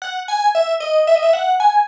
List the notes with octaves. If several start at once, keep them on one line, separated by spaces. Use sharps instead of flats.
F#5
G#5
E5
D#5
E5
D#5
E5
F#5
G#5